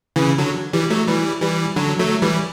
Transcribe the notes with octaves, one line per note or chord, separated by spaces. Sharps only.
C#3 E3
D3 F#3
E3 G3
F#3 A3
E3 G3
E3 G3
D3 F#3
F#3 A3
E3 G3